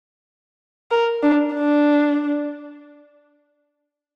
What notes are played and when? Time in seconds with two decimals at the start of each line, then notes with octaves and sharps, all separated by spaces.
0.91 A#4
1.23 D4
1.54 D4